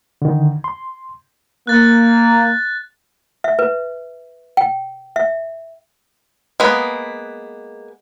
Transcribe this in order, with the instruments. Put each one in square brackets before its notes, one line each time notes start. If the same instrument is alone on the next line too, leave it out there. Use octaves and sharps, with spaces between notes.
[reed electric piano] D3 D#3
C6
[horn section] A#3 [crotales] F#6 A6
[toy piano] E5
B4
G5
E5
[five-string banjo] G#3 A#3 B3 B4